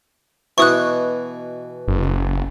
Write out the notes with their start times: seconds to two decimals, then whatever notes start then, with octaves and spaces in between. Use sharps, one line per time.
0.58 B2 E3 C#6 D#6 F#6
1.88 F#1